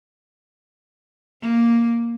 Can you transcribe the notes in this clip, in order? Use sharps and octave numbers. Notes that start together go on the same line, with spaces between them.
A#3